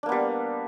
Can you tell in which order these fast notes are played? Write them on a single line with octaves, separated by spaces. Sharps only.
D4 A#3 B3 G3